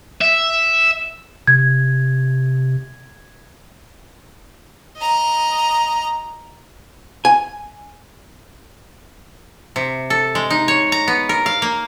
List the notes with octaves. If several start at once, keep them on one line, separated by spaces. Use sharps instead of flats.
E5
C3 G#6
D#5 A#5
G#5
C3
A4
G#3
D#4
C#5
A#5
B3
A#4
F5
A#3